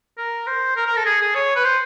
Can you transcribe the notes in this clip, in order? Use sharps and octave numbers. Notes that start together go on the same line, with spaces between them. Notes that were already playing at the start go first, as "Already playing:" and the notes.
A#4
C5
A#4
A#4
A4
G#4
G#4
C#5
B4
C5